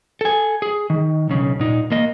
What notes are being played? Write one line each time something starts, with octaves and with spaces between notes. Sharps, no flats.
A4 G#5
G#4
D#3
B1 C#3
A#2 D#4
A#3 D#5